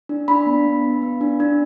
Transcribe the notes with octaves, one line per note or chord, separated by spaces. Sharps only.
D4
D4 B5
B3
B3
B3
B3
D4
D4